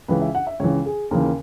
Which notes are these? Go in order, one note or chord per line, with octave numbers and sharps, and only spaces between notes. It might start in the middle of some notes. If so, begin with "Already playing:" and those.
C#2 C#3 E3 B4
E5
F#5
E5
C#2 C#3 E3 C#5
G#4
D#2 C#3 E3 A#4